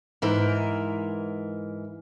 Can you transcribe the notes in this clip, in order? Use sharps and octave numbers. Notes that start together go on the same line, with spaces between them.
G#2 E3 A#4